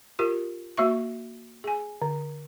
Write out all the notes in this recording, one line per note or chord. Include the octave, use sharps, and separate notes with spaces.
F4 G4 A#4
A#3 F#4 E5 C#6
G#4 G#5
D3